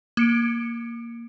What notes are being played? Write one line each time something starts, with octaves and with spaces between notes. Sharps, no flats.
A#3 C#7 D7